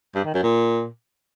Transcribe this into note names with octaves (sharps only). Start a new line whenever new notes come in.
G2
D#3
F#2
A#2